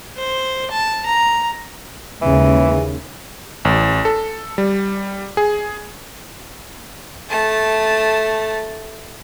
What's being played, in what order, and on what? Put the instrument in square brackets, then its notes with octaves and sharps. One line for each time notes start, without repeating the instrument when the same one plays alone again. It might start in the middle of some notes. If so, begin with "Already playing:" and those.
[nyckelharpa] C5
A5
A#5
[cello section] D#2 C#3 G#3 [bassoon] E3
[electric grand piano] A1
A4
G3
G#4
[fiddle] A3 A5